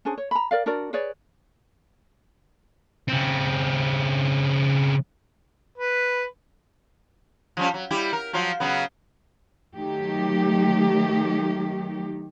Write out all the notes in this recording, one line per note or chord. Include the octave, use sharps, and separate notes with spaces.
C#4 D4 G#4 C5
C#5
A#5 B5
A#4 D5 F5
D4 F#4 A#4 D5
G#4 B4 C#5 D5
C#3 C4
B4
F3 G3 C#4
F#3
G3 E4 G4
A#4
F3 F#3 F4
C#3 F#3 B3
D#3 F#3 A3 D#4 G4